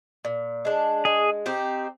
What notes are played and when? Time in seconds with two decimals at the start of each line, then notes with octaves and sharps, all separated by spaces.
0.25 A#2
0.65 G#3 D4
1.05 G#3 G#4
1.46 C4 D#4 G4